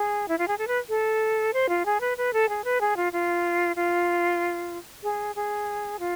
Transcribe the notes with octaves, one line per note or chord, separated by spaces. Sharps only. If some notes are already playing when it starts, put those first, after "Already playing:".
Already playing: G#4
E4
F4
G#4
A4
B4
A4
C5
F4
G#4
B4
B4
A4
G#4
B4
G#4
F4
F4
F4
G#4
G#4
F4